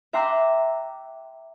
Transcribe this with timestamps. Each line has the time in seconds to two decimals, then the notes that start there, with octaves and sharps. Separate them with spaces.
0.13 E5 G5 A#5 C6 D6 F#6